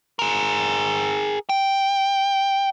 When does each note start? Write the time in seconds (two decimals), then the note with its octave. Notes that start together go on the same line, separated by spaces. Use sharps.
0.19 G#4 A#4
1.49 G5